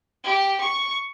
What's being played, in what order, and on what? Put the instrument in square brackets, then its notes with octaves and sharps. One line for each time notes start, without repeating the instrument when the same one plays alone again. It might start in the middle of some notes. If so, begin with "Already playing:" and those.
[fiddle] G4
C#6